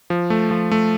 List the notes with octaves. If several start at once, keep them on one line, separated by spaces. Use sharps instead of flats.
F3
A3
F3
A3